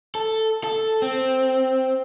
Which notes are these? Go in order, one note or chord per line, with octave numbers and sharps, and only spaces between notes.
A4
A4
C4